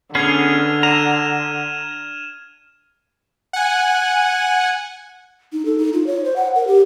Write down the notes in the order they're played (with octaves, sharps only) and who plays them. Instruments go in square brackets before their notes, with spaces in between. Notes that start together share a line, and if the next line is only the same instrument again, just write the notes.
[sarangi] D3 [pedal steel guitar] B3 C#4 G#4 [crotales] F6 G#6 F7
[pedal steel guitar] A#5 [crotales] F6 D#7 E7
[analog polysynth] F#5 G#5
[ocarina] D#4
A4
D#4
F4
C#5
C5
F#5
A#4
G4